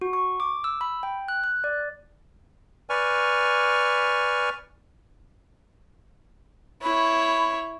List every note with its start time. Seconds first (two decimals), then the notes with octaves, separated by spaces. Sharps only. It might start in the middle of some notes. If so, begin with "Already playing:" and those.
0.01 F#4
0.13 C#6
0.40 D6
0.64 E6
0.81 B5
1.03 G5
1.28 F#6
1.44 F#6
1.64 D5
2.90 B4 D5 G#5 C#6 F6
6.82 E4 C#5 B5